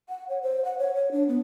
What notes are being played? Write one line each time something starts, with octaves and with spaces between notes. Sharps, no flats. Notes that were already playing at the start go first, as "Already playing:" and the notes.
F#5
C#5
C5
F#5
C#5
C#5
D4
B3